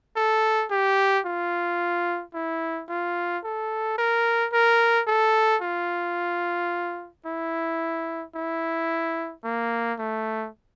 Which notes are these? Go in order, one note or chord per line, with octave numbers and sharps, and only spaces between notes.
A4
G4
F4
E4
F4
A4
A#4
A#4
A4
F4
E4
E4
A#3
A3